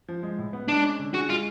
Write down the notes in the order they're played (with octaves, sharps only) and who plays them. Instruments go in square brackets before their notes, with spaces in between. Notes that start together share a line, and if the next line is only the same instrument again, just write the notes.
[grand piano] F3
G#3
A2
B3
[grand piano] G#3 [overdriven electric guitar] D4
[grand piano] C#4
D3
[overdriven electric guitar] F#4 [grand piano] G#4
[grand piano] G#3 [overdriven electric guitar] F4